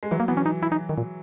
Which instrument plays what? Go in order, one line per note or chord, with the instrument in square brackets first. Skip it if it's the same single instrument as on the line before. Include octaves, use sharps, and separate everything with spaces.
[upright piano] G#3
[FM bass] E3 [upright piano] F#3
[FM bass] A#3
[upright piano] E3 [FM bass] B3
[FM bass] C#4
D#4
E4
D#4
D#3
A#2